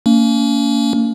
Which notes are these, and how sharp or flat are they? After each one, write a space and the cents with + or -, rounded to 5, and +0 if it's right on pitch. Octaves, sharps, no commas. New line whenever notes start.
A#3 -30 C#4 +40